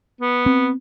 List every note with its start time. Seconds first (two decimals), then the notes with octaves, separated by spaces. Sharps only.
0.21 B3
0.46 C4